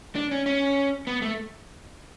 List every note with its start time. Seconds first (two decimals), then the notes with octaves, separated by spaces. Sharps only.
0.15 D4
0.31 C#4
0.46 C#4
1.07 B3
1.22 A3